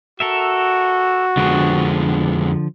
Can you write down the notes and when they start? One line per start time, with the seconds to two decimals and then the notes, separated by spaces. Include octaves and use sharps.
0.20 F#4 A4 A#4 E5
1.37 F2 D3 F3 G#3 B3